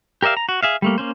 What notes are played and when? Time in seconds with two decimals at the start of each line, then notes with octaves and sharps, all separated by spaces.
0.23 G4 A#4 D5 E5 F5
0.37 A#5
0.49 F#4
0.63 G#4 E5 F5
0.82 G3 A3 A#3
0.98 A#3 C#4 C5